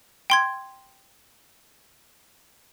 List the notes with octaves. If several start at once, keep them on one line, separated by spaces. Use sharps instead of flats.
G5 C6 G#6